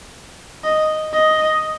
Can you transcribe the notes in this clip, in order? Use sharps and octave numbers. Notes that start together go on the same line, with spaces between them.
D#5
D#5